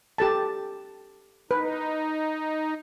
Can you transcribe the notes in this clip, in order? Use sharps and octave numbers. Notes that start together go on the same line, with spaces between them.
G4 A4 A5
D#4 B4